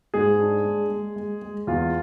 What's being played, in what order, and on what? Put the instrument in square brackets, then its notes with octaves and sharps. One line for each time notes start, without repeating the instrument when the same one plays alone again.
[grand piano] G#2 G#4
D4
G#3
G#3
G#3
G#3
E2 F4